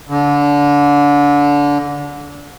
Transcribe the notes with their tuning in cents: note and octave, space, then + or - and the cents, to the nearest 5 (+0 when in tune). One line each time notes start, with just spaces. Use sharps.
D3 -25